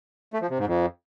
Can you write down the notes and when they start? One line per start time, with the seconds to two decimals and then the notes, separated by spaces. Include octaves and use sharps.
0.33 A3
0.42 F3
0.50 C3
0.59 G#2
0.67 F2